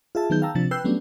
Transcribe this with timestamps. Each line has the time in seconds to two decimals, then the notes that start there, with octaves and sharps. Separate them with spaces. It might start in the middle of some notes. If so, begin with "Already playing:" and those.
0.15 F4 G#4 E5 A5
0.30 D#3 F#3 B3 D#4 G#4 G6
0.42 F5 G5 A5 A#5 E6
0.55 C3 F3 D4 A6
0.71 B4 G5 E6 F#6 G6 C7
0.84 F#3 G3 A3 B3 C#4 D4